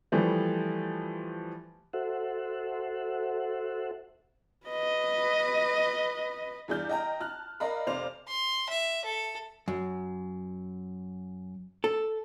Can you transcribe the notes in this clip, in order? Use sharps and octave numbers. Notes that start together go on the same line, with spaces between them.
E3 F3 G3 A3
F#4 A4 C5 E5 F#5
B4 D#5
E2 G2 G#4 D5 F6 G6
D#5 G5 A#5
A5 F6 F#6
A#4 D5 D#5 F5 A#5 B5
F1 C5 D5 F5 D6 F7
C6
E5
A4
F#2
A4